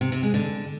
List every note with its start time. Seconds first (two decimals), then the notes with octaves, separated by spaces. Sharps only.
0.01 C3
0.12 C3
0.23 G#3
0.34 D3